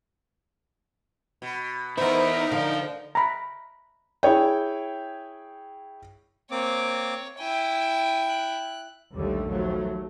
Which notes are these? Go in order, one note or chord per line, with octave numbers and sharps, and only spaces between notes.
B2
B3 D#4 E4 A#4 C5
D3 C5 F5
A#5 B5
E4 G#4 C#5 G5
A#3 C4 C#5 D6
E4 G5 G#5
F#6
A#1 D#2 D3 G3 A3
D#2 F3 F#3 A3